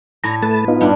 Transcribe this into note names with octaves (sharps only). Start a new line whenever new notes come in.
A2 A#5
A3 B4 A5
B3 D#4 F4
G2 D4